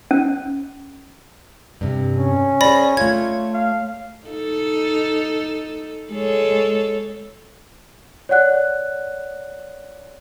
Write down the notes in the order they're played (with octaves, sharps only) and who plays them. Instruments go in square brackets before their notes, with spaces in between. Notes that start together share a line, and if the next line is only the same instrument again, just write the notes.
[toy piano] C#4
[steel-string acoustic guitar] G2 C3
[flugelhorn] C#4
[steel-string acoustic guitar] G#4 C5 [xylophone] D5 B5 A#6
[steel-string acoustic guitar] A3 C#5 [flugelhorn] F4 [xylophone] G#6
[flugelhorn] F5
[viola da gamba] D#4 A4
G#3 A4 C#5
[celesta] C#5 D5 F#5 F#6